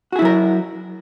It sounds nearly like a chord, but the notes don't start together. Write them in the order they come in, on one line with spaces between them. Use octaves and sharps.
F#4 G#4 E4 F#3 A#4